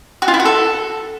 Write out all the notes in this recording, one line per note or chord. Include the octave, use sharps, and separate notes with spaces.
F#4
F4
E4
F#4
A4